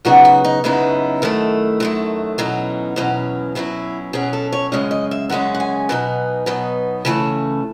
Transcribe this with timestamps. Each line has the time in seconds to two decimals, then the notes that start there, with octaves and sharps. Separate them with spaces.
0.05 F#2 C#3 F#3 B3 D#4 F#4
0.25 F#4
0.44 D#4
0.64 F#2 C#3 F#3 B3 D#4 E4
1.22 F#2 D#3 A3
1.80 F#2 D#3 A3
2.38 E2 B2 F#3 C#4 D#4
2.96 E2 B2 F#3 C#4
3.55 B2 F#3 C#4 E4
4.13 B2 F#3 C#4 G#4
4.33 A4
4.52 C#5
4.72 F#2 C#3 G#3 C#4 D#5
4.91 D#5
5.11 E5
5.30 F#2 C#3 G#3 C#4 F#5
5.54 F#5
5.60 G#5
5.89 B2 F#3 B3 D#4
6.46 B2 F#3 B3 D#4
7.05 C#3 E3 A3 C#4 A5